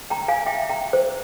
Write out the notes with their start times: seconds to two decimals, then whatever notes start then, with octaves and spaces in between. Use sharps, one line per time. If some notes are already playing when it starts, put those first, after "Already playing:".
0.10 G5 A#5
0.28 F5 G#5
0.46 E5 G5
0.69 G5 A#5
0.93 C5